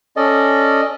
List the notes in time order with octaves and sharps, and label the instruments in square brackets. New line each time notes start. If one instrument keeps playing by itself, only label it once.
[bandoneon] C#4 A4 D5 D#5